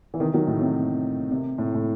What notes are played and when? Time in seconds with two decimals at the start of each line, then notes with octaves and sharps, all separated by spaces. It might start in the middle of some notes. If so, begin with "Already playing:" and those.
0.14 E3
0.20 C3 D#3
0.34 D#3 F#3
0.47 A2
0.61 C3
1.31 C3
1.58 A2
1.75 A2